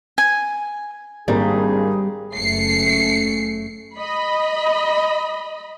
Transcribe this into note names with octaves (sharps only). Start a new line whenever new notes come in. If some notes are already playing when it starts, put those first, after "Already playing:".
G#5
G#1 G3 G#3 A#3 D4 G#4 A#5
F#1 A3 C#4 C7 C#7
D#5 B5